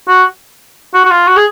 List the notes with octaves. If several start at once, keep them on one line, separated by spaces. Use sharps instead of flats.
F#4
F#4
F#4
F4
F#4
G#4